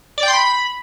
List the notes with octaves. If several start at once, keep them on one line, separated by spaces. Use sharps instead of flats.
D5
G5
C6
B5